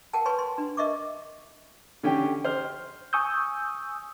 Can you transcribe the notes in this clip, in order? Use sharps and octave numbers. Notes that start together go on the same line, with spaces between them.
A#4 F#5 G5 A5
B4 C#5 G#5 C6 C#6
C6
D4
A#4 D#5 E5 C#6 D6
D3 C#4 G4 G5
C5 F6
G#5 C#6 D#6 E6 G6